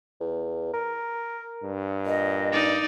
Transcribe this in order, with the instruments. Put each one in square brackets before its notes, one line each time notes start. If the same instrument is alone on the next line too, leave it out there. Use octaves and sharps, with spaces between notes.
[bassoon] E2
A#4
[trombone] G2
[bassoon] A#2 [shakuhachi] D#5
[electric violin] D#4 D5